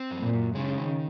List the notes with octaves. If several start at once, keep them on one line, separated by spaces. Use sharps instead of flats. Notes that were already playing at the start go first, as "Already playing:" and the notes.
Already playing: C4
F#2
A#2
F#2
C#3 G#3
D#3